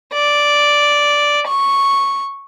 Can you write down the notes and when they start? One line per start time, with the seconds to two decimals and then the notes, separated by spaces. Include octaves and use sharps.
0.14 D5
1.48 C#6